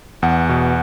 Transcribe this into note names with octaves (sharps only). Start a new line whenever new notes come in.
E2 F#5
B2